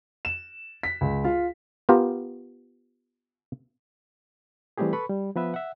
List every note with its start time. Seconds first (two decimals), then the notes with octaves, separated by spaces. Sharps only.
0.25 E7
0.83 B6
1.01 C#2
1.24 F4
1.89 B3 F4 G4 A#4
4.78 E3 G3 A3 C4 G4 G#4
4.93 A4 B4 B5 C#6
5.09 G3
5.36 F3 B3 B4 E5
5.54 E5 F#5